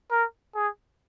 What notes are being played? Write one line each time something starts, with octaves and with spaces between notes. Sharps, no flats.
A#4
G#4